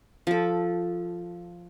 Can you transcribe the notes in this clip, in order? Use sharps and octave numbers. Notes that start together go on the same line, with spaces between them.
F3 A4